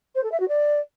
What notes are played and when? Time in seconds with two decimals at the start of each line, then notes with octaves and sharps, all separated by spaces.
0.15 C5
0.23 A4
0.31 E5
0.40 F#4
0.48 D5